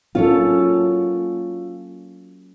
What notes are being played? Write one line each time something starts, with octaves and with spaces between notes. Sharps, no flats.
F#3 A#3 C#4 F4 A4 C#5